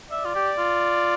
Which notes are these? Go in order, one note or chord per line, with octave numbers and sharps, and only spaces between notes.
D5 E5
F4
G4
F4